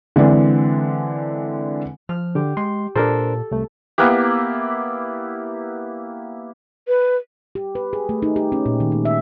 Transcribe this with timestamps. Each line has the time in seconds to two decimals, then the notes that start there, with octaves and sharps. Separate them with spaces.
0.16 D3 E3 G#3 C4 D4
2.09 F3 F6
2.35 D3 G4
2.57 G#3 C6
2.96 A#2 D4 A4 A#4 C5
3.51 C2 A3
3.98 A#3 B3 E4 G4
6.87 B4
7.55 G4
7.75 B4
7.93 G#4
8.09 A3
8.23 D#4
8.36 G4
8.52 C#4
8.66 A#2
8.80 D#3
8.92 G#3
9.05 E5